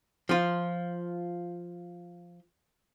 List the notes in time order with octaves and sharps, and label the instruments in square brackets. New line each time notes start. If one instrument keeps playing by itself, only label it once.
[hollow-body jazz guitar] F3 F4